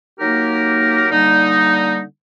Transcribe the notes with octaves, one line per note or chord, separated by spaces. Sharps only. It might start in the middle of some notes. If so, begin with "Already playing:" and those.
F#3 A#3 D#4 G4 A#4
D3 G3 A#3 D#4